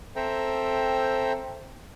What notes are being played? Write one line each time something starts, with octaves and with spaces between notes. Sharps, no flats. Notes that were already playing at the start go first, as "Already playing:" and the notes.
C4 A4 C5 E5 G5 A#5